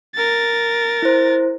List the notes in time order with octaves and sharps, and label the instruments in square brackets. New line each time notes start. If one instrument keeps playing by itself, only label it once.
[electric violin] A#4 A6
[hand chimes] E4 C5